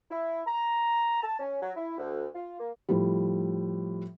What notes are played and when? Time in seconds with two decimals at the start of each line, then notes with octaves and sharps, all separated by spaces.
0.11 E4
0.46 A#5
1.22 A5
1.39 C#4
1.62 F#3
1.76 E4
1.98 D2
2.35 F4
2.60 A#3
2.89 A2 F3 G3